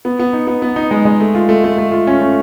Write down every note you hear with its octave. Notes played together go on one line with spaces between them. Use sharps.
B3
B3
D#4
B3
B3
D#4
G#3
G#3
A3
F4
A3
A3
A3
F4
C#4
A3